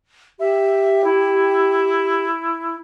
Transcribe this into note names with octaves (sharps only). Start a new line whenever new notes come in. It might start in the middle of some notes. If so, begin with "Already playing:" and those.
G4 E5
E4